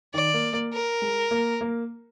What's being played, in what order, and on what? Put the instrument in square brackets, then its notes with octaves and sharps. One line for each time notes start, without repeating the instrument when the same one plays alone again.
[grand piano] D#3 [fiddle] D5
[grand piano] A#3
A#3
[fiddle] A#4
[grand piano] G#3
A#3
A#3